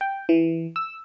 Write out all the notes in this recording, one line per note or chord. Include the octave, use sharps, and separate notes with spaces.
G5
E3
E6